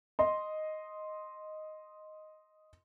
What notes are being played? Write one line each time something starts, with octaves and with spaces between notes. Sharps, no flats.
D#5 C6